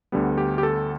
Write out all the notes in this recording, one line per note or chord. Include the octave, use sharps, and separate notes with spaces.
D2 D3 G3 B3
G4
G4
A4